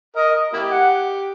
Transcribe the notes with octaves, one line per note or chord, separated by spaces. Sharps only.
A#4 D#5
A#3 E4 G4
F#5